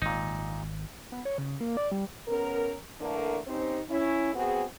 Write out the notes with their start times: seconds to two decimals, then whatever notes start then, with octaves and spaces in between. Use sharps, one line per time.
0.02 G#1 A#2 D#4
1.12 B3
1.25 C#5
1.38 C#3
1.61 A#3
1.77 D5
1.92 G3
2.28 C#3 B3 C#4 A#4
3.01 D3 E3 A3 A#3 D4 A#4
3.47 C4 C#4 D#4 G4 C5
3.90 C#4 E4
4.34 B3 C4 F#4 G#4